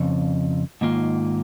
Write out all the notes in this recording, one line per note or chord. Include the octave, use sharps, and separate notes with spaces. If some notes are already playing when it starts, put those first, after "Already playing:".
Already playing: F2 C#3
G#2 D#3 A#3 F4